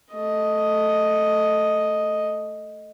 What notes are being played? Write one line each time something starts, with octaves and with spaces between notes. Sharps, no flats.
A3 D#5